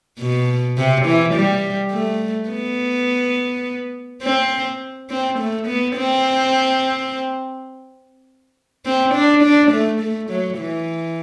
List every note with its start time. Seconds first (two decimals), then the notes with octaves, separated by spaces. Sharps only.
0.20 B2
0.78 C3
1.05 E3
1.34 G3
1.92 A3
2.50 B3
4.23 C4
5.10 C4
5.39 A3
5.67 B3
5.96 C4
8.86 C4
9.14 D4
9.43 D4
9.71 A3
10.01 A3
10.30 F#3
10.58 E3